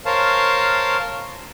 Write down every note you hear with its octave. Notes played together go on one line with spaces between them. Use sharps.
A#4 C5 C#5 F5 A5